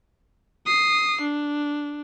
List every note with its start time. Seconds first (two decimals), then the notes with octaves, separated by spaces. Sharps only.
0.66 D#6 C7
1.21 D4